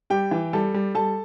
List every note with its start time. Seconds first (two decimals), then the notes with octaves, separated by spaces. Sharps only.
0.10 G3 G4 G5
0.31 E3
0.53 G3 A4 A5
0.74 G3
0.94 G3 A4 A5